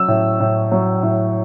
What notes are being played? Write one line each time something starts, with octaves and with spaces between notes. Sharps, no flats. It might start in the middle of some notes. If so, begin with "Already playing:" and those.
Already playing: F#3 E6
A2
A2
F#3
A2